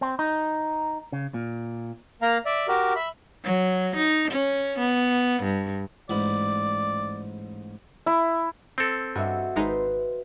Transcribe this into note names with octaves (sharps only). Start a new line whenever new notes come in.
C4
D#4
C#3
A#2
A#3 F5 A#5
D5 E5
F#4 G4 A#4
E5 B5
F#3
D#4
C#4
B3
G2
A1 G#2 D5 B5
E4
C4 A4
G2 F#4 D#5 E5
G#1 G#3 D#4 B4 C5